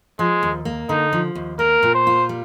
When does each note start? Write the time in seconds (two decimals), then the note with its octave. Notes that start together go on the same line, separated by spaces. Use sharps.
0.19 F3 G#3
0.43 D#2
0.65 A#3
0.89 D3 D#4
1.13 F3
1.35 D#2
1.59 A#3 A#4
1.83 A#2
1.95 C5
2.07 F4
2.29 G3